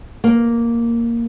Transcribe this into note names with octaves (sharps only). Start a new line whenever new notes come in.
A#3